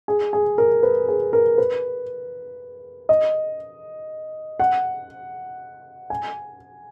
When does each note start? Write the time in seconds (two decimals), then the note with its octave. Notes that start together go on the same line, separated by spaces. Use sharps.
0.08 G#4
0.33 G#4
0.58 A#4
0.83 B4
1.08 G#4
1.33 A#4
1.58 B4
3.09 D#5
4.60 F#5
6.10 G#5